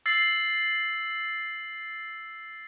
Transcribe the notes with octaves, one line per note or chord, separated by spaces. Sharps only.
E6 A6 C7